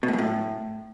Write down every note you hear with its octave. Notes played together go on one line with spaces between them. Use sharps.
B2
A2
F#2
A2